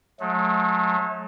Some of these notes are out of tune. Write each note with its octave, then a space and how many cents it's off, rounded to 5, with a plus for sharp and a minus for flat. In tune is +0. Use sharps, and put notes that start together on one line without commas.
F#3 -35 A3 -40